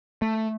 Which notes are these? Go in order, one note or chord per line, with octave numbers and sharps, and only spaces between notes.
A3